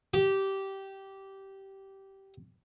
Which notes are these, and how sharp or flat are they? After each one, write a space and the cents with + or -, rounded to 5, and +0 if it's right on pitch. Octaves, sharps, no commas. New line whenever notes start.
G4 -15